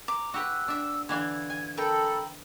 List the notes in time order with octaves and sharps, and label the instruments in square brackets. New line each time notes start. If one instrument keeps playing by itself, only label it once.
[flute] A#5 [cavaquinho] D6
[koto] F#4 G4 B4 [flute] E6
[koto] D4 E5
[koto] D3 E3 F5 [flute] G#6
[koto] G#5
[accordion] A4 [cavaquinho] A#4 G5 [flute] B5